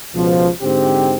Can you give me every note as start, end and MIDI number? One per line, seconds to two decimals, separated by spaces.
0.15 0.48 37
0.15 0.48 47
0.15 0.48 53
0.63 1.18 44
0.63 1.18 50
0.63 1.18 60
0.63 1.18 67